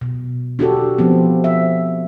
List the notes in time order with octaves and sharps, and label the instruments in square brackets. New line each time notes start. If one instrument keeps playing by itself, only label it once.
[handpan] B2
D4 F#4 G4 A4
F3 B3 C4
E5